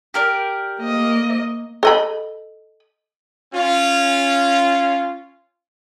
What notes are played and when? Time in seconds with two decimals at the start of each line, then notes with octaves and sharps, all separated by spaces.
0.14 G4 A#4 D5
0.80 A#3 D#5
1.83 A4 D#5 B5
3.54 C#4 F4